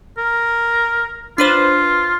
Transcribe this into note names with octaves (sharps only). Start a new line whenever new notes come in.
A#4
D4 F4 B4 C5